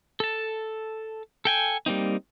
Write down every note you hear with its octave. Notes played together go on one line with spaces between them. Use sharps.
A4 A5
A4 G5 G#5
G3 A#3 C4 D#4